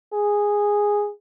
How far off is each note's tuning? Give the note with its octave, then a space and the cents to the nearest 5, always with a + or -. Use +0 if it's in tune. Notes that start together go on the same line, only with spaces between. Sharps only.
G#4 -10